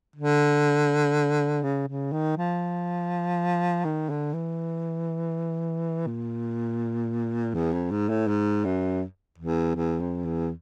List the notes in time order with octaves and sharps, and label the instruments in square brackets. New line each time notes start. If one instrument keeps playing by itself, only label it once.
[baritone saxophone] D3
C#3
C#3
D#3
F3
D#3
D3
E3
A#2
E2
F2
G#2
A2
G#2
F#2
E2
E2
F2
E2